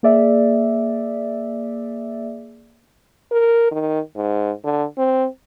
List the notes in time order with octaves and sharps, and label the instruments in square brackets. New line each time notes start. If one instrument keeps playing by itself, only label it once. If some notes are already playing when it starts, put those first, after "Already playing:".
[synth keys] A#3 G#4 D5 E5
[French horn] A#4
D#3
G#2
D3
C4